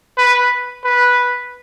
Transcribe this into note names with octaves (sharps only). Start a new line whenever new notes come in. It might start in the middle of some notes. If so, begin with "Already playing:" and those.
B4
B4